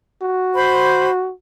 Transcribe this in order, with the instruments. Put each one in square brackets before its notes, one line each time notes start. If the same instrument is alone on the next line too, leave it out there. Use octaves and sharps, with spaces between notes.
[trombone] F#4
[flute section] C5 B5